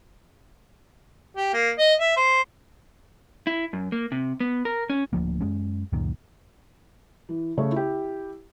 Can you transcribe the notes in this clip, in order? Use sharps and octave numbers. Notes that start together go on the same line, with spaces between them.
G4
A#3
D#5
E5
C5
E4
F#2
A#3
C3
B3
A#4
C#4
D1 D2 F3 A#3
F#2 G#3 C#4
C#2 F#2 A#2 D#3
E3
C#3 A3 C#5
E4 G4